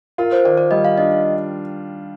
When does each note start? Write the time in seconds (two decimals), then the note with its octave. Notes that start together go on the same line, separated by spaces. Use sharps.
0.18 F4 A#4
0.32 C5
0.45 D#3 D5
0.57 D5
0.71 G3 D#5
0.85 F5
0.98 D4 D#5